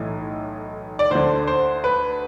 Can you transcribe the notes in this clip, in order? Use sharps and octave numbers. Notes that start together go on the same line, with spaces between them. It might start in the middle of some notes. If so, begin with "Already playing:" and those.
Already playing: B1 A2 E3
D5
D2 D3 C5
C5
B4